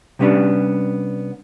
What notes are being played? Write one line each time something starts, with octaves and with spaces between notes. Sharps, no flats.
C3 G3 B3 C#4 D4